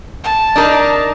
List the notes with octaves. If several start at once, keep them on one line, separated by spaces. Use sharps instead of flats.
A5
D4 D#4 A#4